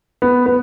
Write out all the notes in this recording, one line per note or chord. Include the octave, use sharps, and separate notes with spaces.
B3
B3